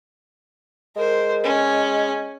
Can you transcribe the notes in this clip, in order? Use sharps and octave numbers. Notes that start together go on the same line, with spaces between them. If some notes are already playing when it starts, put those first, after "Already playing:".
G#3 A#4 C5
C#4